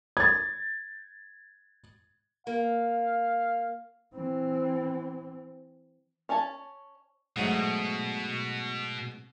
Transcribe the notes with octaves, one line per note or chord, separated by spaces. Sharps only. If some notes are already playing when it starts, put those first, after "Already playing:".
G#6 A6
A#3 F5
E3 C4
C#4 C#5 G#5 A5
G#2 B2 F#3 A3